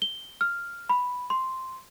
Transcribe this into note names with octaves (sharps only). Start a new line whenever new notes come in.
G7
F6
B5
C6